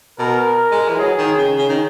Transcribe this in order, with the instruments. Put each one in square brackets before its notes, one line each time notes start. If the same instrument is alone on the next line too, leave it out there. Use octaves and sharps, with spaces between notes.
[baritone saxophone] B2 [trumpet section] A#4
[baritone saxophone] G#3
E3
[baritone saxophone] F#3 [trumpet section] G#4
[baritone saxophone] D#3
C#3
C#3
D#3